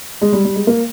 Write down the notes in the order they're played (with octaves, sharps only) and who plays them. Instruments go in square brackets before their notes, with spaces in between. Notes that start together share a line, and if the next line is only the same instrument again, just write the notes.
[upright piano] G#3
G3
G3
G#3
A#3